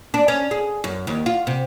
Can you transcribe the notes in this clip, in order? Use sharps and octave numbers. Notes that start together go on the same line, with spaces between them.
D4
C#4
G#4
F#2
D#2
F4
C3